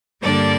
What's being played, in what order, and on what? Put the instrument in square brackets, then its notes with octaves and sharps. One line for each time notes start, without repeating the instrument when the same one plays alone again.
[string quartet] G2 D3 G3 A#3 D4 D5